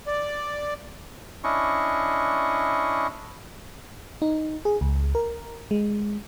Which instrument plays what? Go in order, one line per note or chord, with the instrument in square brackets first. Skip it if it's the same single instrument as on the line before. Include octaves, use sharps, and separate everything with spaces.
[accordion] D5
[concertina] C#4 D4 E4 D#5 C#6
[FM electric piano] D#4
G#4
C#2
A#4
G#3